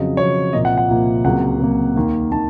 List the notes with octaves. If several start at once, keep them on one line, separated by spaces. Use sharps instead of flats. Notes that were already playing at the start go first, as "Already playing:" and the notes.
Already playing: F2 C#3 F#3 D#5
F2 C#3 F#3 C#5
C2 A#2 F3 A#3 D#5
F#5
F#5
C2 A#2 F3 A#3
C#2 C3 F#3 A#3 F#5
C#2 C3 F#3 A#3
D#2 D#3 A#3
D#3 A#3 A5